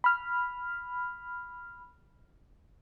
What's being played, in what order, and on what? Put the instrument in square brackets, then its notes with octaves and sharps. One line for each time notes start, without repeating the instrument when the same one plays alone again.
[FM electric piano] B5 F6